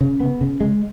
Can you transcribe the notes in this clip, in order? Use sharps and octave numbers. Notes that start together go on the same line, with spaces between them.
C#3
B3
C#3
G#3